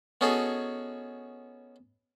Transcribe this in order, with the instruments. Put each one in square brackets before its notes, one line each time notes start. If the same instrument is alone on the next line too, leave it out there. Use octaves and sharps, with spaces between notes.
[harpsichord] B3 C#4 D#4 F#4 G#4 A4